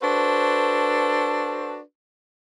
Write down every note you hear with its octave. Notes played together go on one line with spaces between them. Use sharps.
D4 F#4 A4 B4 C5